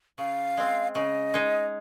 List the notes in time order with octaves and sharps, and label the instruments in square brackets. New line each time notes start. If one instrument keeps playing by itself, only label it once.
[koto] C#3 [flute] F5
[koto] G#3 C4
[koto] C#3 [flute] D#5
[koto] G#3 D#4